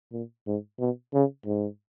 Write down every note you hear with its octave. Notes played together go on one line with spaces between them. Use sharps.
A#2
G#2
B2
C#3
G#2